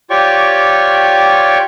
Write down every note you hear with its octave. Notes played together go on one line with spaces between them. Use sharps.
F4 G4 C#5 D5 G5 C#6